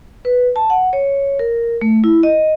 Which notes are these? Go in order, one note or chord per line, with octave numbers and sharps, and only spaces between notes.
B4
A5
F#5
C#5
A#4
A3
E4
D#5